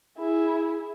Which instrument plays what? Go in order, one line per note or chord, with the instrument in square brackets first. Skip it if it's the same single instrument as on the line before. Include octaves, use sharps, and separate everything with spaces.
[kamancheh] E4 G#4